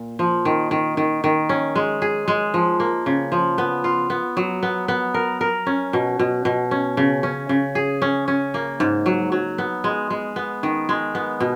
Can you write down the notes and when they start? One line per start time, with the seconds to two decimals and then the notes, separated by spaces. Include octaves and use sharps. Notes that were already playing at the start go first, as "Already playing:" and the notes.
Already playing: A#2
0.19 F3
0.45 D#3
0.71 D#3
0.97 D#3
1.24 D#3
1.49 C#4
1.76 G#3
2.02 G#4
2.28 G#3
2.54 F3
2.80 A#3
3.06 C#3
3.32 F3
3.58 B3
3.84 F4
4.10 B3
4.37 F#3
4.63 B3
4.88 B3
5.14 A#4
5.41 A#4
5.67 C#4
5.93 B2
6.19 B2
6.45 B2
6.71 C#4
6.97 C#3
7.23 C#4
7.49 C#3
7.75 G#4
8.02 C#4
8.28 C#4
8.54 A#3
8.80 G#2
9.06 F#3
9.32 F#3
9.58 B3
9.84 G#3
10.10 G#3
10.36 B3
10.63 D#3
10.89 G#3
11.15 B3
11.40 B2